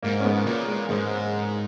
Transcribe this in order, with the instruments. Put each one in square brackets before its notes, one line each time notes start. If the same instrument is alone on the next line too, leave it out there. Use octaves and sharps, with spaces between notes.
[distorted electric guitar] G#2 [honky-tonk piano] A#3
[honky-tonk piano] C#4
G#3 B3
[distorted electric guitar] A#2 [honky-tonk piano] A#3
[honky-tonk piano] G#3
[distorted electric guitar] G#2 [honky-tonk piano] G#3